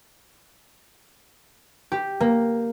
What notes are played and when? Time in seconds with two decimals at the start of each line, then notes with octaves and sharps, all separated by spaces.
1.92 G4
2.20 A#3